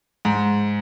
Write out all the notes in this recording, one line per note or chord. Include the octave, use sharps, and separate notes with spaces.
G#2